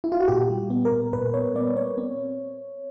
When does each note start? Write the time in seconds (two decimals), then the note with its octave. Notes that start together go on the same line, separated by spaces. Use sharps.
0.04 E4
0.12 F4
0.20 F#4
0.28 A#2 G4
0.50 G3
0.70 B3
0.85 A#4
0.92 A#2
1.13 A#2 B4
1.34 B3 C#5
1.56 B3 D5
1.76 B3 C#5
1.98 C4